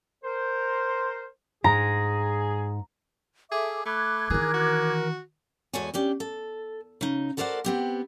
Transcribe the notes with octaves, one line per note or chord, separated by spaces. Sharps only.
A#4 C5
G#2 G#4 A#5
G#4 A4 E5 D6
A3 B5 D6 F#6 G#6
D#3 E3 G#4 A#4
F#4
E2 G#3 F#4 A4 C#5 G#5
C#4 D4 G4
A4
C#3 D#4
F#4 A4 A#4 C5 D5 F#5
B3 C4 G4